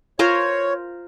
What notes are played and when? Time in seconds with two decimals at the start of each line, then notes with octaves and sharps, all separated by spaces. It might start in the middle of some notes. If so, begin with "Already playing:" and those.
0.19 F4 A#4 C5 C#5